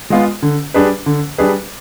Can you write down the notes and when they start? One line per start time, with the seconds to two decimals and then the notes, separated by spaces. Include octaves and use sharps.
0.10 G#3 B3 F4
0.42 D3
0.74 G3 D4 G#4 B4
1.06 D3
1.38 G3 D4 G#4 B4